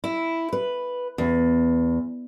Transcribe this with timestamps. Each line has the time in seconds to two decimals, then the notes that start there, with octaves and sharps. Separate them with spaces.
0.04 E4
0.53 B4
1.18 E2